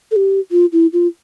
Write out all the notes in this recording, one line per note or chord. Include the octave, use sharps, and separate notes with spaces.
A4
G4
F4
E4
F4